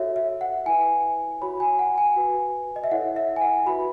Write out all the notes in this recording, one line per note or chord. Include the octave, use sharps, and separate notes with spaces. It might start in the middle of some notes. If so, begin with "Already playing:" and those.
Already playing: F#4 A4 C#5 E5
E5
F#5
E4 B4 G#5
F#4 C#5 B5
G#5
F#5
G#5
F#4 B4
D#5
E5
E4 A4 C#5 F#5
E5
G#5
F#5
F#4 B4 B5